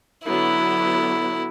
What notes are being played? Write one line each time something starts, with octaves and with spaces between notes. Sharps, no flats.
D3 F#3 B3 E4